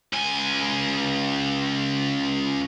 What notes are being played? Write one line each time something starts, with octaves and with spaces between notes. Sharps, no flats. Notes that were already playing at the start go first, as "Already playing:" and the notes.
C#2 G#5